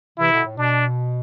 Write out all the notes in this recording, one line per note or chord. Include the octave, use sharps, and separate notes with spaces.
C3 E3 E4
B2 D3
A2
B2 D4